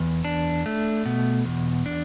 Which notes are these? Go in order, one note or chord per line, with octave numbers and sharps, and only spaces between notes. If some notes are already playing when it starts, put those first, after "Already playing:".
Already playing: E2
D4
A3
B2
E2
D4